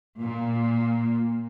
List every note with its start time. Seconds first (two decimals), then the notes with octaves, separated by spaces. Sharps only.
0.19 A#2